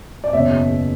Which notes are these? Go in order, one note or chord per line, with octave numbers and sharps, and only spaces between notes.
D5
F#1 E2 B2 C#5 E5